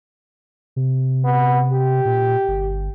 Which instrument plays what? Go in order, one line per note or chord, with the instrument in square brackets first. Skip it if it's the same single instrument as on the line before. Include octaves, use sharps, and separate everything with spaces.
[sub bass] C3
[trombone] B3
G4
[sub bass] A#2
G1